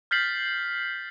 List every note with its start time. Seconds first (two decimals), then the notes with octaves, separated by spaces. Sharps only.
0.11 F6 G6 A6 B6 C7 F#7